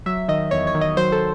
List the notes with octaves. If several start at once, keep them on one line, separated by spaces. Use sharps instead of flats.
F#3 E5
D#3 D#5
E2 C#5
C#5
D#3
D#5
F#3 C5
A4